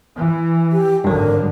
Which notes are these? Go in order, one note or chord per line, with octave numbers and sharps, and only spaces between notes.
E3
G4
G#1 G2 D3 F#3 A#4